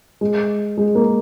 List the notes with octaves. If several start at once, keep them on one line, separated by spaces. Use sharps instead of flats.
G#3
G#3
A#3